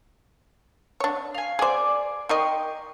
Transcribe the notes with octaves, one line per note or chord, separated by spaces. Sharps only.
D4 C#5
F5 G#5
G#4 C5 D5 G#5
D#4 A#4 D#5 G5 C6 C#6